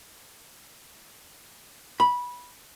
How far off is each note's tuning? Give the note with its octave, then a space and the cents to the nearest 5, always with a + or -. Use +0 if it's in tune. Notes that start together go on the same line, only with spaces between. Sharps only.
B5 -15